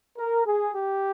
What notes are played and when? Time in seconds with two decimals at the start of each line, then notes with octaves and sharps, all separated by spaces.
0.18 A#4
0.45 G#4
0.73 G4